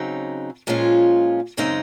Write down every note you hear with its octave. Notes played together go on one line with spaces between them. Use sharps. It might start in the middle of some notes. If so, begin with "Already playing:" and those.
Already playing: C#3 F#3 C4 D#4
A#2 F3 G#3 C#4 F4
F#2 C#3 G#3 C4 D#4